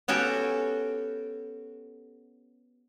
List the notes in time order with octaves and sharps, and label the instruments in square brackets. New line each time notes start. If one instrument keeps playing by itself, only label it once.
[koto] B3 C#4 F#4 G4 A4